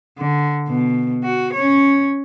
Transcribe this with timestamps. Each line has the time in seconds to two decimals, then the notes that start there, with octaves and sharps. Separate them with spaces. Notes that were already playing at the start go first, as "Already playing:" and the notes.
0.18 D3
0.69 B2
1.24 F#4
1.53 C#4 C#5